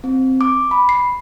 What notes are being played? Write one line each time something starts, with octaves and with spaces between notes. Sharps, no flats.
C4
D6
B5
C7